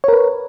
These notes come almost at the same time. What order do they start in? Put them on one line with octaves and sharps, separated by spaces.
C#5 A#4 B4